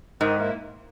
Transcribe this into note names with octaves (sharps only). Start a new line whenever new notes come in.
G#2 D#3
A#3 E4